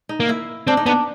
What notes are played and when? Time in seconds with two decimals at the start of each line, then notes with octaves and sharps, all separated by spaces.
0.09 D#4
0.20 A#3
0.29 E4
0.67 C4 D4
0.77 D#4
0.86 B3 D4